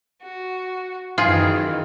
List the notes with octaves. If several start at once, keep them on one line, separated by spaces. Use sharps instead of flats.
F#4
F#2 D#3 E3 F4 G#4